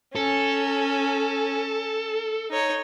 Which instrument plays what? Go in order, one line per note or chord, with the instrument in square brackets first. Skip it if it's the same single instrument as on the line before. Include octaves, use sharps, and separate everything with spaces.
[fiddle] C#4 [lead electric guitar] A4
[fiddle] D#4 C#5